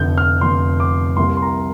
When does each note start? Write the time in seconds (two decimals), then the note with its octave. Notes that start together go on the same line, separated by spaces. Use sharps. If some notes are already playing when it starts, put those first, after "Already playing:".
Already playing: F1 F2 D3 G6
0.18 F6
0.41 F1 F2 D3 C6
0.80 D6
1.17 C2 C3 A#3 C6
1.37 C6
1.42 A#5